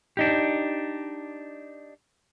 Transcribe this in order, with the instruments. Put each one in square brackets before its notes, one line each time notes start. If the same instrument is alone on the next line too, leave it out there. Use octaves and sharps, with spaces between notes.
[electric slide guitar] D4 D#4 G4